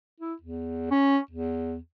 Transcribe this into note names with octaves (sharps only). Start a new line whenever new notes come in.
E4
E2
C#4
E2